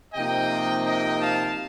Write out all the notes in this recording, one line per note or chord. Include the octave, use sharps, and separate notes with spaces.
C3 F3 A#3 D#4 D#5 G5
D#5 G5
F5 A5